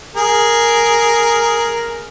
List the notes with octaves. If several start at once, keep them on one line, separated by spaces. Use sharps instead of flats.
G#4 A#4